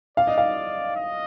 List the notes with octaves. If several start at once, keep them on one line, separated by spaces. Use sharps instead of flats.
D5 F5
D#5
F5
D#5